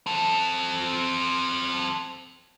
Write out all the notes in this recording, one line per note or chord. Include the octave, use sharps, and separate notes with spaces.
C4 A4